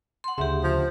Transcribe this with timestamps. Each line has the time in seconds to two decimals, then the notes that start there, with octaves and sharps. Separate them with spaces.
0.24 F#5 C6
0.38 D2 C#3 G4 E5
0.64 F3